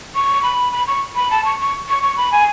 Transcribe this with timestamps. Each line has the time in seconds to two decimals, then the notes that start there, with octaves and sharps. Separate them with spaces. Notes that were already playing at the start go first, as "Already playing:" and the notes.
0.15 C#6
0.43 B5
0.72 B5
0.87 C#6
1.16 B5
1.31 A5
1.45 C#6
1.60 C#6
1.89 C#6
2.03 C#6
2.17 B5
2.32 G#5